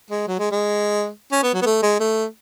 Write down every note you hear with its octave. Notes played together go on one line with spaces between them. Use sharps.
G#3
F#3
G#3
G#3
C#4
B3
F#3
B3
A3
G#3
A3